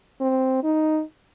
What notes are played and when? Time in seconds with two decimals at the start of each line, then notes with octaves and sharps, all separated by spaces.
0.21 C4
0.64 D#4